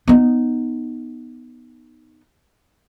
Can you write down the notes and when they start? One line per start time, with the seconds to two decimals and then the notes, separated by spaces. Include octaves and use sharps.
0.08 B3 D#4